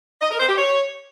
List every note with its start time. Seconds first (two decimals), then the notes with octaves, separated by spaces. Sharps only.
0.22 D#5
0.31 A#4
0.40 C5
0.49 G4
0.58 C#5